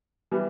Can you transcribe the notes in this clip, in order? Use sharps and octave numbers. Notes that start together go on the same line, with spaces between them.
E3 G3 B3